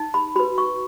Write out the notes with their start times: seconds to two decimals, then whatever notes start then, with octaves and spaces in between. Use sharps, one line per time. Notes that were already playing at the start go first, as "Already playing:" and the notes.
Already playing: D#4
0.14 B5
0.36 F#4 B4 B5
0.58 C#6